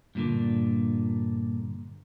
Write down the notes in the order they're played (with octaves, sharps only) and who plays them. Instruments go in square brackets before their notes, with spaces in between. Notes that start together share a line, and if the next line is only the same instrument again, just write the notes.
[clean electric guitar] G2 A#2 D3